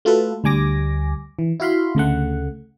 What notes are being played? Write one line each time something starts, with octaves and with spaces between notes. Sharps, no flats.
A3 F4 F#4 A4 B4
D2 G3 G#5 D6 A#6
E3
E4 F#4 F5 B5 C6
D2 C#3 A3 F#5